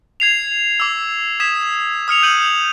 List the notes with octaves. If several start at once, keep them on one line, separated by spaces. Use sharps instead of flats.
G#6 C7 F7
D6 E6
D#6 G#6 B6 E7
D#6 F6 C#7 F7
G6 D#7 F#7